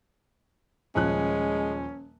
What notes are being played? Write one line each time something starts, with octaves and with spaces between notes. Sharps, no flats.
D#1 F3 G#3 C#4 F#6